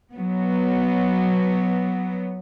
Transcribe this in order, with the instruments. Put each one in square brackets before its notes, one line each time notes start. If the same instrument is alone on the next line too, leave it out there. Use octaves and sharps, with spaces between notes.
[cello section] F#3 B3